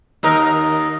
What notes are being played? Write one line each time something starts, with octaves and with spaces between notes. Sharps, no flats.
D#2 D#4 A#4